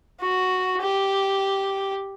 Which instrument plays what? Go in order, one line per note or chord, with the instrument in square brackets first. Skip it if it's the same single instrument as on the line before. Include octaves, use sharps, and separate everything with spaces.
[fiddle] F#4
G4